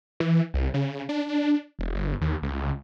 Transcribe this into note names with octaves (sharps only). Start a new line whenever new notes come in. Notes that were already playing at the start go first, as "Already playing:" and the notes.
E3
C2
C#3
D4
E1
G1
D#2
C#2